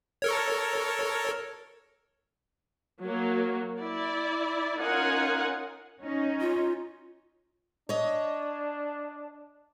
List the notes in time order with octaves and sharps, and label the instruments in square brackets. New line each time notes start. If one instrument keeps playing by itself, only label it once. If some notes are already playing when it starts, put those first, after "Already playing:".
[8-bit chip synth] A4 A#4 C#5
[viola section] F#3 A#3
E4 D5
C#4 D#4 F4 A#4 F#5 G#5
[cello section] C#4 D#4
[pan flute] F4
[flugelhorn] D4 [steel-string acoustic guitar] C#5 D#5